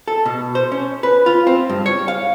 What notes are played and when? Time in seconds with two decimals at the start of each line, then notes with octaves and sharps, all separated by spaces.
0.08 A4
0.26 B2
0.55 C5
0.72 C#4
1.03 B4
1.26 F4
1.47 C4
1.70 G2
1.86 C#5
2.08 F5